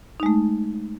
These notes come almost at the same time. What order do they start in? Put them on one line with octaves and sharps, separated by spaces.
D#4 G#3 A3